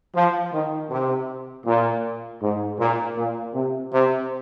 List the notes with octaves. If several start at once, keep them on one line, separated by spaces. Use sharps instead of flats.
F3
D#3
C3
A#2
G#2
A#2
A#2
C3
C3